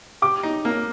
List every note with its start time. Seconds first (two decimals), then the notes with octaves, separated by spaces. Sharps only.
0.22 G4 D6
0.43 D#4
0.65 A#3